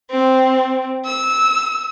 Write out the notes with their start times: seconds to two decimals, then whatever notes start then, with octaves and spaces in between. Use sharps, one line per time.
0.11 C4
1.05 E6